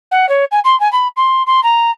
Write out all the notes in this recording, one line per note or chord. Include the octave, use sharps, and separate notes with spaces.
F#5
C#5
G#5
C6
G#5
B5
C6
C6
A#5